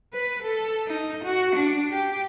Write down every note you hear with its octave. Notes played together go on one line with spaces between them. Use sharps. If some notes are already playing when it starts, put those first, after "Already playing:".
B4
A4
D#4
F#4
D4
G4